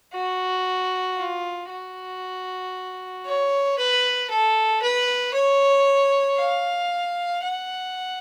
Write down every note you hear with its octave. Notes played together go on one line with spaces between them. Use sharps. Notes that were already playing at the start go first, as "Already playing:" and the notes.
F#4
F4
F#4
C#5
B4
A4
B4
C#5
F5
F#5